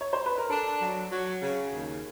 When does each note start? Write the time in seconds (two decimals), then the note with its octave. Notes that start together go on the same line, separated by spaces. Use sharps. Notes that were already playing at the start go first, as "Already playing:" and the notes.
0.01 C#5
0.13 C5
0.26 B4
0.38 A#4
0.50 D4 A4
0.81 F#3
1.11 F#3
1.42 C#3
1.71 D#2